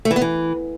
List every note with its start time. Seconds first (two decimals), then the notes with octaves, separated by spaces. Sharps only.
0.05 A3
0.11 E3
0.16 B3
0.21 E3